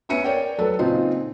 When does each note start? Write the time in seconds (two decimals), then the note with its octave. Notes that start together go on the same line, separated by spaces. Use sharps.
0.09 B3 C#4 E5 C#7 D#7
0.24 A#4 C#5 D5 G5
0.58 F#3 A4 B4
0.79 A#2 C#3 C4 D#4 F4